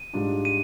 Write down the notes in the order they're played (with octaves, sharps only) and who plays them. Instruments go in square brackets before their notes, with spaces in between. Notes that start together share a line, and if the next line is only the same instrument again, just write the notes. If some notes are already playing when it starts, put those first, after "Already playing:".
Already playing: [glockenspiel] D#7
[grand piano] G#2 G3 D4 F4
[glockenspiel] D#7